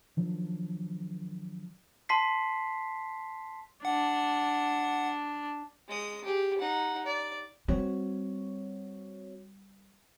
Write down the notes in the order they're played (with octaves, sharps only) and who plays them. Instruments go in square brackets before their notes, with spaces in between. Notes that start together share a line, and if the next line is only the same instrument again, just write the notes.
[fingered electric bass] D#3 F3 F#3 D4
[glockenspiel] A5 C6 B6 C7
[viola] D4 [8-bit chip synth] F#5
[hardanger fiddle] G#3 D#6
G4 G#4
D#4 F#5
D5
[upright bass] G3 [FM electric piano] C4 F#4 C#5